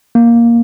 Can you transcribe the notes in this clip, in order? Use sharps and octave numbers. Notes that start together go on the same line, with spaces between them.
A#3